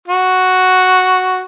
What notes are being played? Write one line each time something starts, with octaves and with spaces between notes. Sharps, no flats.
F#4